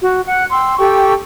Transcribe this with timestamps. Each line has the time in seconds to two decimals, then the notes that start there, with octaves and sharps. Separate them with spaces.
0.02 F#4
0.28 F#5 F#6
0.51 G5 C6 E6
0.78 G4 A4 G5 C#6